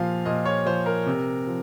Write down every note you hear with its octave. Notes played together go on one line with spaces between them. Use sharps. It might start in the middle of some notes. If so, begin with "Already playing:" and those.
Already playing: A#2 F3 F5
A#2 D#5
C#5
F3 C5
A#4
C3
F3